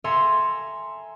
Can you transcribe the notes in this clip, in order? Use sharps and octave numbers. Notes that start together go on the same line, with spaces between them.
A4 E5 G#5 A#5 C6 C#7